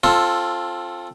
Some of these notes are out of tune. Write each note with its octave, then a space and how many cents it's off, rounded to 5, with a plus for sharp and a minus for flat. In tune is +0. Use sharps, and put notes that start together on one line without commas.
C4 +25 F4 +0 A4 +0